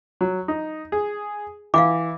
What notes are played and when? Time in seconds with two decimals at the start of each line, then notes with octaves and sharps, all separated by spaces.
0.21 F#3
0.48 D#4
0.92 G#4
1.74 E3 F5 F#5 D6